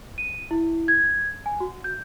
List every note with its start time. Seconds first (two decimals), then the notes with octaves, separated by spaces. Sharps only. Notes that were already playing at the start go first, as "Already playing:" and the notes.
0.18 D#7
0.51 E4
0.88 G#6
1.46 G#5
1.60 F#4
1.84 G6